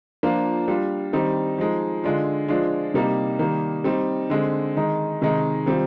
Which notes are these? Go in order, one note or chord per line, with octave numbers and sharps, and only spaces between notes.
F3 A#3 D4 F4
G3 D4 F4
D#3 G3 C4 D#4
F3 G#3 D#4
D3 G#3 D4 F4
F3 G#3 D4 F4
C3 G3 A#3 D#4
D#3 G3 A#3
G3 C4 D#4
D3 G#3 C4
D#3 G#3 D#4
C3 D#3 G#3 D#4
D#3 G3 C4 F4